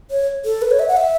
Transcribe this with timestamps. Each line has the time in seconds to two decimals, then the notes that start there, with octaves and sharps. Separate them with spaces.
0.11 C#5
0.45 A4
0.62 B4
0.71 C#5
0.79 E5
0.88 F#5
0.97 E5